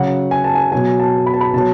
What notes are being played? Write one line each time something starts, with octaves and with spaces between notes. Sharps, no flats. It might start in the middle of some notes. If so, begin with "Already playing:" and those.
Already playing: C#3 F#3 F#5
G#5
A5
G#5
B2 F#3 G#5
A5
B5
A5
B5
B2 F#3 A5